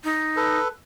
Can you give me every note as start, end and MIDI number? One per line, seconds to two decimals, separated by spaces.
0.04 0.58 63
0.37 0.68 69
0.37 0.68 71